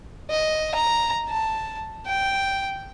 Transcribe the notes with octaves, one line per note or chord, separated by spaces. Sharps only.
D#5
A#5
A5
G5